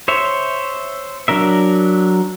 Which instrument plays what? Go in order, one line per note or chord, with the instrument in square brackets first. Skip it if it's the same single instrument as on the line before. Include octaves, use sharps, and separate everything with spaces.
[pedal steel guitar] C5 C#5 E5
F#3 D4 A#4 E5